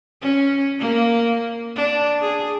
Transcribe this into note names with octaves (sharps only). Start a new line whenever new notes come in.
C#4
A#3
D4
G#4